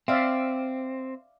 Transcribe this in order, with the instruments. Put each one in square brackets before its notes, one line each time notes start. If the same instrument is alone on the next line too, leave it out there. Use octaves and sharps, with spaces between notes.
[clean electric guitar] C4 [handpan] D5 E5 F5